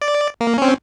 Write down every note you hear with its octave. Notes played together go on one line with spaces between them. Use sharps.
D5
A#3
C4 C#4